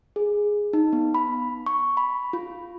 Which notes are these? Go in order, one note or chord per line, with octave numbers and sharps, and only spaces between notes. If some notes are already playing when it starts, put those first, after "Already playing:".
G#4
D#4
B3
B5
C#6
B5
F4